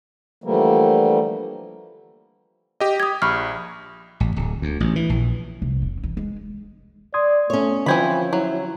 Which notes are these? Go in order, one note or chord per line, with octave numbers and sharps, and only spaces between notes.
D3 E3 F3 G3 A3 A#3
G4 D#5
D#6 G#6
A#1 B5 C#6 F6
A1
D1
D2
A1
E3
A#1
C2
F1
E3
G#3
D5 C6 D#6 G#6
A3 C#4 C#5
D3 E3 F3 C4 B5 G#6
F#3 E4